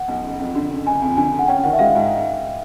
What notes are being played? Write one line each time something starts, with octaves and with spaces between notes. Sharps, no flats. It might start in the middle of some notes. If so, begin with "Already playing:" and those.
Already playing: F#5
B1
F#1
F2
D3
F#1
F#1 G#5
F2
D3 G#5
F#1
F#5
C#4 G5
D#3 F#5
E5
G#3 F5
G#2